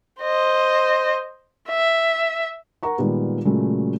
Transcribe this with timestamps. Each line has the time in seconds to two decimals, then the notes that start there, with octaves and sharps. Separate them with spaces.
0.22 C5 D#5
1.69 E5
2.83 A#4 F#5 A#5 C#6
2.98 A#2 D#3 G3 G#3 B3
3.45 A#2 C#3 F#3 G#3 A3